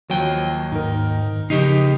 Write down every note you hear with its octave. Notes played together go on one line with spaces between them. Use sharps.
D#2 F3 F#3 G5
G#2 D#4 A#4
C#3 F3 D#4 G4 D#5 C7